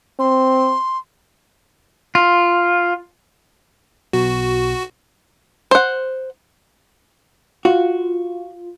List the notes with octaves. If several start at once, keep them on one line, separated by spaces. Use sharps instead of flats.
C4 C6
F4
B1 B2 F#4
C5 F#5
F4 F#4